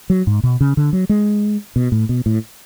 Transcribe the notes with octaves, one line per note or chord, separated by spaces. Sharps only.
F#3
G#2
B2
C#3
D3
F#3
G#3
B2
A2
B2
A2